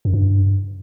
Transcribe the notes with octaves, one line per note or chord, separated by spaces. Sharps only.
F#2
G2